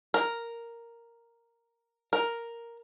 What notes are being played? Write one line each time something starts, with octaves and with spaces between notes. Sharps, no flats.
A#4
A#4